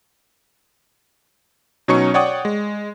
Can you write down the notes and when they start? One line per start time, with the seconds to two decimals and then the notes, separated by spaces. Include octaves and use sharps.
1.88 B2 F#3 C#4 D#4 C#6 C#7
2.14 C#5 D5 F#5 G5 C#6 D#6
2.45 G#3